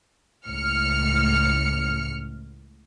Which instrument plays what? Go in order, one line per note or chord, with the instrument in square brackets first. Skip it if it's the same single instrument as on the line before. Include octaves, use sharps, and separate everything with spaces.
[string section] C#2 A2 F6 C#7